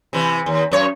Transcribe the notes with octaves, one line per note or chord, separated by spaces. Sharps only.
C3 E3
D#2
F#2 C#5